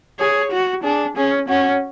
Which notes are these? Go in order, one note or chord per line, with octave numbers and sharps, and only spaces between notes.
G#4 C#5
F#4
D4 G#4
C#4 G#4
C#4 F#4